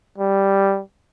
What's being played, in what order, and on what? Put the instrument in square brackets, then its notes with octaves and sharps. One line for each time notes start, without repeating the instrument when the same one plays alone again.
[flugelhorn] G3